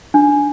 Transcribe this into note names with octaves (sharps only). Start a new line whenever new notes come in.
D4